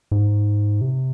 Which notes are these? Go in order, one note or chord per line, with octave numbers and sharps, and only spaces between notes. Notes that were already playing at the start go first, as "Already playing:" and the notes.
G#2
C3